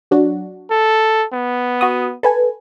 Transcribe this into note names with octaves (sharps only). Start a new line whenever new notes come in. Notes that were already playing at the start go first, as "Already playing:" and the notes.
F#3 D4 F#4
A4
B3
F#4 D#6
A4 B4 G#5